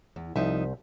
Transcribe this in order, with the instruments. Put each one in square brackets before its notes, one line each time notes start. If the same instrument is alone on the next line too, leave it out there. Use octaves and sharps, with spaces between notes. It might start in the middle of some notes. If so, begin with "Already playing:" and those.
[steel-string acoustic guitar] E2
[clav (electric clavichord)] C2 C5 [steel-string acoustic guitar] F3 D#4 E5